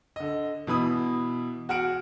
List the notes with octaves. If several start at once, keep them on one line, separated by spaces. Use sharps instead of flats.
D3 D#5
B2 E3 B5 D#6
F#4 G#4 F#5 F6 D7